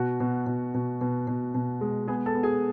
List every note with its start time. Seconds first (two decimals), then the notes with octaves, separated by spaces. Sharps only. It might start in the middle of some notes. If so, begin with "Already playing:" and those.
Already playing: B2 F#4 F#5
0.20 B2
0.47 B2
0.74 B2
1.01 B2
1.28 B2
1.54 B2
1.81 G#3
2.08 B3 G#4 G#5
2.26 A4 A5
2.35 B3
2.43 G#4 G#5